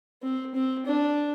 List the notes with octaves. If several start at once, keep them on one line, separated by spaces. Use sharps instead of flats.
C4
C4
D4